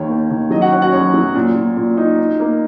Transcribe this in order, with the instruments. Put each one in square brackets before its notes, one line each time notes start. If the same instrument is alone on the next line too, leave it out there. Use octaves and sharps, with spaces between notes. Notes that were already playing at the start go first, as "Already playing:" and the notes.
Already playing: [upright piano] D#2 D#3 C#5
A#3
D#3
F#3 D#5
F#4 F#5
C#4 F#4 F#5
F#4 F#5
F#2 C#5
F#3
A#2
A#2
A#2
D#4
D#4
A#3